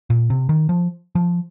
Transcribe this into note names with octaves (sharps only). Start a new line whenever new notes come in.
A#2
C3
D#3
F3
F3